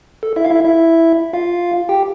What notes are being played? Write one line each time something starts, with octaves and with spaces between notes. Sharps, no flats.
A4
E4 E5
F5
E4 E5
E4 E5
F4 F5
G4 G5